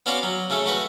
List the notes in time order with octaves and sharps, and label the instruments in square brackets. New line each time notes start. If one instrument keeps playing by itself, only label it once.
[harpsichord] B3 C#4 F4 F#4 D5 F5
F#3
C#3 A3 C#4 A4
A3 F#4 B4